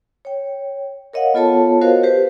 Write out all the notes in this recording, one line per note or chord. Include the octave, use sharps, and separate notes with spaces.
C#5 G5
A#4 C#5 D#5 F5 F#5
B3 F4 A4 C#5 A5
F#4 A#4 C5 C#5 D#5 F5
G4 B4 C5